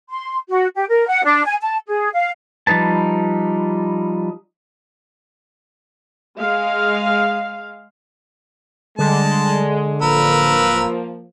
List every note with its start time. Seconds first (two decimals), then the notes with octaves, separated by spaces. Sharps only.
0.10 C6
0.49 F#4
0.75 G4
0.88 A#4
1.07 F#5
1.24 D4
1.46 G#5
1.61 A5
1.87 G#4
2.13 F5
2.67 F3 G3 D#4 B4 A5
6.37 G#3 F5
8.99 D3 G3 G#3 A5
10.02 D1 F3 A#3 A#4 B4 E6